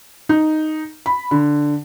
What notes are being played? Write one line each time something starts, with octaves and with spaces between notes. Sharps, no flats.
D#4
B5
D3